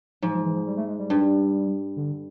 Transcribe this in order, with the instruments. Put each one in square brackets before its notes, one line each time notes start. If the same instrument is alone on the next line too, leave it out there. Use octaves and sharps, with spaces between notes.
[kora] G#2 [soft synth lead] F3
[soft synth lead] F3
E3
F3
G3
A3
G#3
G3
[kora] G2
[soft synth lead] D3